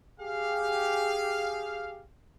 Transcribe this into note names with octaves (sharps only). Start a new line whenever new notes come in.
G4 G#4 F5